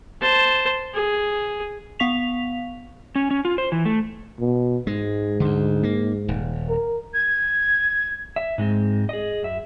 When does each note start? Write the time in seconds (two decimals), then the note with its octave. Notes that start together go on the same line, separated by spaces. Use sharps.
0.21 C5 A5
0.94 G#4
1.99 B3 F5 C#6 B6 F7
3.16 C#4
3.31 C#4
3.45 F4
3.58 C5
3.72 E3
3.85 A3
4.40 B2
4.87 G#2 G#3
5.40 D2 D3
5.83 A#3
6.28 D#1
6.69 A#4
7.13 G#6
8.36 E5
8.58 G#2 G#3 C4
9.09 G#4 D#5
9.43 F#2 E5